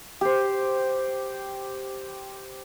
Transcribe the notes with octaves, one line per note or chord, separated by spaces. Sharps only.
G4 C5